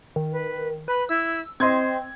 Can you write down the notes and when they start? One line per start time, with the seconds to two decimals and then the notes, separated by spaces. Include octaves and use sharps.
0.16 D#3
0.32 B4
0.88 B4 B5
1.09 E4 E6
1.60 C4 C5 D#5 C6 G#6